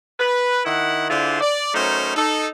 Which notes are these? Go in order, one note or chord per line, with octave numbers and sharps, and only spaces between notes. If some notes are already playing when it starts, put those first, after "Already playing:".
B4
D#3 E4 F#5
D3 D4 E4 F4 G#4 C5
D5
F#3 A3 C#4 D#4 A#4 C5
D#4 A4